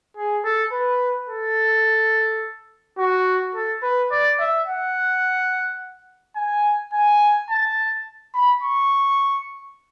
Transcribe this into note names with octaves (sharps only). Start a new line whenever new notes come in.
G#4
A4
B4
A4
F#4
A4
B4
D5
E5
F#5
G#5
G#5
A5
B5
C#6